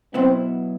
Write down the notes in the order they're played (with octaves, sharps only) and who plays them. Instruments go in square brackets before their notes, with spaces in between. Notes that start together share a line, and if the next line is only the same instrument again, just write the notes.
[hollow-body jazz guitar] B2 F#3 B3 E4 [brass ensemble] C4